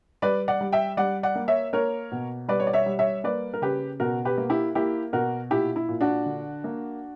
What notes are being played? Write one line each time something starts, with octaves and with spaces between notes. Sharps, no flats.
G3 B4 D5
D5 F#5
G3
E5 G5
G3 D5 F#5
D5 F#5
A#3
C#5 E5
A#3 A#4 C#5
B2
G3 B4 D5
C#5
D5
C#5 E5
G3
C#5 E5
A#3 B4 D5
A#4
C#3 G4 B4
B2 F#4 A#4
G4 B4
A#3
E4 G4
A#3 E4 G4
B2 F#4 A#4
A#2 E4 G4
E4
A#2
D4 F#4
D3
A#3